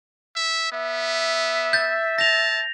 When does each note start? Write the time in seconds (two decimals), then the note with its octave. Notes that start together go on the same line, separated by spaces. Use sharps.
0.36 E5
0.72 B3 E5
1.73 G6 A6
2.19 A5 A#6 F7